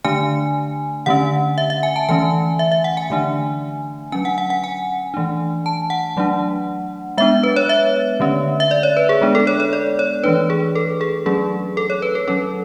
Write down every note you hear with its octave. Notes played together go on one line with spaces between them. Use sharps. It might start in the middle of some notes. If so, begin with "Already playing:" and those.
D3 A3 D4 G#5
D3 A3 C#4 F#5
E5
E5
G#5
A5
E3 A3 C#4 G#5
E5
E5
F#5
G#5
D3 A3 D4
F#3 C#4 G#5
F#5
F#5
F#5
G#5
E3 A3 D4
A5
F#5
F#3 A3 D4
G#3 B3 D4 E5
B4
C#5
E5
D3 A3 C#4
E5
D5
C#5
B4
G#4
G#3 B3 D4
A4
C#5
C#5
D5
C#5
E3 A3 D4 B4
G#4
A4
G#4
F#3 A3 C#4 G#4
A4
C#5
B4
A4
F#3 C#4 A4